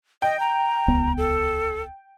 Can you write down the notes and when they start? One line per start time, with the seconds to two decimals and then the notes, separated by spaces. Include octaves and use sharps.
0.22 D#5 G5
0.40 A#5
0.88 D#1 C#2 B3
1.17 A4